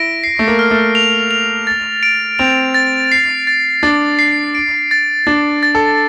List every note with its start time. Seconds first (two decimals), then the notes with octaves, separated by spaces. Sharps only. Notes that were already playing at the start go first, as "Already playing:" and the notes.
Already playing: E4 A#6 D7
0.24 C7
0.39 A3
0.48 A#3
0.59 F6
0.71 A3
0.95 F7
1.31 F7
1.67 A6
2.03 D7
2.39 C4 F7
2.74 A6
3.12 C7
3.47 A6
3.83 D4 A6
4.19 C7
4.55 D7
4.91 A6
5.27 D4 A6
5.63 A6
5.75 A4